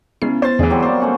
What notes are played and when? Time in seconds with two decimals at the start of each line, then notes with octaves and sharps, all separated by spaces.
0.22 C#3 G#3 B3 E4 C7
0.42 B3 C5 C#5 A6
0.59 E2 D3 E3 G#4
0.70 F#3 G3 C4
0.82 A#3 C5 D5
1.00 A3 C#4 F#5